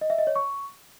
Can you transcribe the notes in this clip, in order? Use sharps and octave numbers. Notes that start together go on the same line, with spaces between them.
D#5
E5
D#5
C#5
C#6